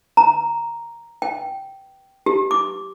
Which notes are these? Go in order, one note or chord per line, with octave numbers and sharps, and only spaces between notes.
A#5
G5
G4
D6